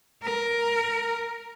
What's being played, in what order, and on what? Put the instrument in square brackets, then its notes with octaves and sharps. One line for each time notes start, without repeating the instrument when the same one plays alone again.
[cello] A#4